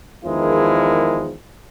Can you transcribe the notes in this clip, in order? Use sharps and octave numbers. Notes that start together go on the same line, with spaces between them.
E2 D#3 F3 G#3 E4 A#4